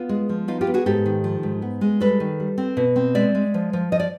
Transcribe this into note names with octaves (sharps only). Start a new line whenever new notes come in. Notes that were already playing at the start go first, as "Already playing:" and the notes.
Already playing: B3 F4
G#3
F3
B3 D#4 F4
F4 G4
B3
F#4 G#4
G#2 G4 A4
D#3
F3
G#2
B3
G#3
G3 A4 B4
D#3
G3
C4
B2
C4
G#3 D5 E5
G#3
F3
F3
F3 D#5
D5